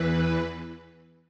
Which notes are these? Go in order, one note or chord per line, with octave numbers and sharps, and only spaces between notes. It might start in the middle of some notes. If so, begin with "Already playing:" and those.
Already playing: E2 E3 B4